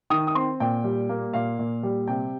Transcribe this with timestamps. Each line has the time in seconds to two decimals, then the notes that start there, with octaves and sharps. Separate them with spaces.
0.10 D#3 D#6
0.27 D#6
0.35 C4 C6
0.60 A#2 G5
0.84 G3
1.09 A#3
1.33 A#2 F5
1.59 A#2
1.83 G3
2.08 C3 G5